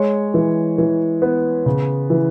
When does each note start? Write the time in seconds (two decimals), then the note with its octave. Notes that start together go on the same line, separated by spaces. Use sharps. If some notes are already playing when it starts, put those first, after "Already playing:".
Already playing: G#3 C#5
0.34 E3
0.78 E3
1.22 B3
1.66 C#3
2.10 E3